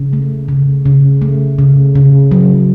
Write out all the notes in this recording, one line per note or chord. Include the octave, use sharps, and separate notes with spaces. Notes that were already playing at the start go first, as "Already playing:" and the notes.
Already playing: C#3
A3
C#3
C#3
A3
C#3
C#3
F#3